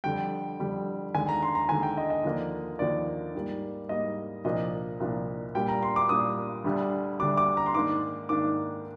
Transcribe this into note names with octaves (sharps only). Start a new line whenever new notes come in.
F2 D3 G3 G5
F2 D3 G3
D#2 D3 G#3 G#5
A#5
C6
A#5
D#2 D3 G#3 G#5
G5
D#5
D#5
D#2 D3 F3 A#3 D4
D#2 D3 F3 A#3 D4 D5
G#2 G3 A#3
G#2 G3 A#3 D#5
C2 A#2 F3 A#3 D4 D#5
C2 A#2 F3 A#3 D4
A#2 G3 A#3 D4 G5
A#5
C6
D6
A#2 G3 A#3 D4 D#6
D2 D3 G3 D4
D2 D3 G3 D4 D6
D6
A#5
C6
G#2 D#3 A#3 D4 D6
G#2 D#3 A#3 D4 D6